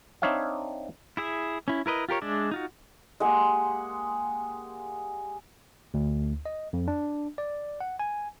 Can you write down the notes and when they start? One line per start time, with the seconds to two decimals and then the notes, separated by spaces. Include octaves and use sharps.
0.22 C4 D4 D#4 C#5 E5 F5
1.17 E4 G#4 E5
1.68 C#4 E4
1.86 E4 A#4 B4 D#5
2.09 F4 G4 A#4 C#5
2.22 G#3 D4 D5 E5
2.51 D#4 F4 F#4
3.20 G#3 A#3 G4 F#5
5.94 D2
6.46 D#5
6.73 F2
6.88 D4
7.38 D5
7.81 F#5
7.99 G#5